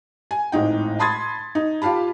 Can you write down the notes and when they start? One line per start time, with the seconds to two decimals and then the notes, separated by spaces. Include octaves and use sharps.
0.31 G#5
0.52 G#1 A2 D#4 G5
0.99 A5 B5 C6 D#6 G#6 A6
1.55 D#4
1.82 F4 G4 F5 A5 B5